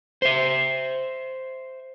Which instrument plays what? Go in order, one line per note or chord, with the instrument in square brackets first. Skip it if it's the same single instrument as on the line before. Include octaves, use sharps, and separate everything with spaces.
[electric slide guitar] C5 E5